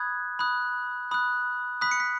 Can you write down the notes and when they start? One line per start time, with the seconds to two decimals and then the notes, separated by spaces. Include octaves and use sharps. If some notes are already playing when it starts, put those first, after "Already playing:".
Already playing: B5 D#6 F#6 G#6
0.39 B5 D#6 F#6
1.11 B5 D#6 F#6
1.81 B5 D#6 F#6 B6
1.91 C#7
2.00 B6